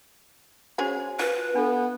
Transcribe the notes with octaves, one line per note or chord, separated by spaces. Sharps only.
C#4 F#4 G#4 C5 G#5
F4 B4
B3 D4 A4